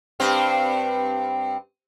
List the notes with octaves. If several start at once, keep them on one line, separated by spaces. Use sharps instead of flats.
G2 C4